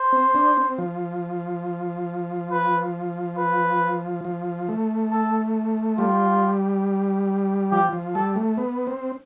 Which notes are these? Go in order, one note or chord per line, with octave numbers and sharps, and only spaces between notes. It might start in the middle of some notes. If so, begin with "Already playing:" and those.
Already playing: C5
C4
D4
C4
F3
B4
B4
F3
A3
A4
G3 F4
F3 G4
F3
G3 A4
A3
B3
C4